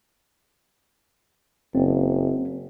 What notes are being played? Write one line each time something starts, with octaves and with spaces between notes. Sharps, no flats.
F#1 C4